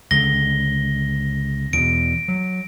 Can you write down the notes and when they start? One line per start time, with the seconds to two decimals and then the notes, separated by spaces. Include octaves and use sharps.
0.11 C#2 D3 A#6 G7
1.73 E2 B2 D7
2.28 F#3